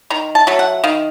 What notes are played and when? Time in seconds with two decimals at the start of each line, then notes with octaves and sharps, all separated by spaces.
0.10 D#3 A#5
0.35 A5
0.47 F#3 A3
0.59 F#5
0.84 D#3 F5